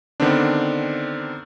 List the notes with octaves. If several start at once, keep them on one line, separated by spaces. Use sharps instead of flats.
D3 D#3 B3 C4 D4